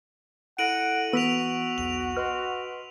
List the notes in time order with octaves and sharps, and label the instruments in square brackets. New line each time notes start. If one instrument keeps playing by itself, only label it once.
[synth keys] E4 A4 A#6 [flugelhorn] F#5 [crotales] D7 D#7 F#7
[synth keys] E3 [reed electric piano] B3 [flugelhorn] F#4 [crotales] E6 B6 F7
[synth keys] B1 E2 [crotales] F7
[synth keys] B4 D#5 C6 [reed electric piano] F6